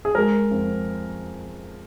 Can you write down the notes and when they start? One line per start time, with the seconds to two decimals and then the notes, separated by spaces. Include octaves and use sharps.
0.05 G#4
0.15 G#3 A#4
0.51 F2